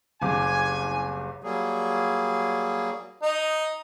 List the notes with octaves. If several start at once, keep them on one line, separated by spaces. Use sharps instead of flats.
F#1 C2 G#5 D6
F#3 G3 A#3 G#4
D#4